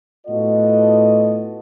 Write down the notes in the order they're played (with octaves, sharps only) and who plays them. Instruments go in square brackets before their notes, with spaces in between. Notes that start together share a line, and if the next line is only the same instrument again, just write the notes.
[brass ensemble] A2 B3 F4 F#4 A4 D#5